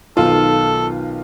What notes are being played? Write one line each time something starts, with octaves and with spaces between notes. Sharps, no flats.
B1 D#3 F4 A4